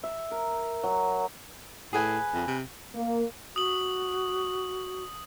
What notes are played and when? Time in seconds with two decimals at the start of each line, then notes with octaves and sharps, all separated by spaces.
0.03 E5
0.31 A#4
0.83 F#3
1.93 A2 G#4 B4 G#5
2.33 F2
2.47 C3
2.94 A#3
3.56 F#4 D#6 F#7